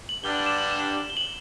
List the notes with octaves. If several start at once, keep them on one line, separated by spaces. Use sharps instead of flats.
F#7
G2 D3 G3 D4 G7
F#7
E7
F#7
E7
G7
F#7